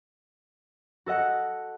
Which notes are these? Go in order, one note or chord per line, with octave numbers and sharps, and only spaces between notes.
F#4 A4 D#5 F#5